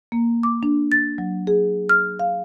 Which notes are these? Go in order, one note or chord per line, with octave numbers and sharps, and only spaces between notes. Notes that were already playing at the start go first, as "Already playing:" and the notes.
A#3
D6
D4
A6
F#3
G#4
F6
F5